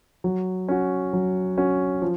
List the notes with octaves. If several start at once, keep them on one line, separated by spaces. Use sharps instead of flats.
F#3
C#4 F#4
F#3
C#4 F#4
F3